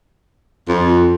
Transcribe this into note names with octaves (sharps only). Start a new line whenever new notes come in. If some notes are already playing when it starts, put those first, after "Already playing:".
F2